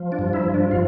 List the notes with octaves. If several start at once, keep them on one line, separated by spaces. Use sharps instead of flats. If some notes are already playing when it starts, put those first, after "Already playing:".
Already playing: F3
D4
G2
E4
F3
D4
F4